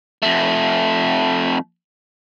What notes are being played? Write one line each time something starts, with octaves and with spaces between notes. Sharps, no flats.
F2 A3